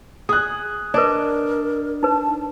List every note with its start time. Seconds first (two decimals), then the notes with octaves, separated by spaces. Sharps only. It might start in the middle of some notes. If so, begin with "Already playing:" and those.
0.29 G#4 D#6 F#6
0.94 D4 A#4 B4 D5 D#5
2.03 D#4 B4 A5